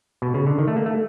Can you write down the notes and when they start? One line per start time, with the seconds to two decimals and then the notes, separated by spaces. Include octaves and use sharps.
0.22 B2
0.34 C#3
0.47 D3
0.59 D#3
0.68 A3
0.77 A#3
0.86 A3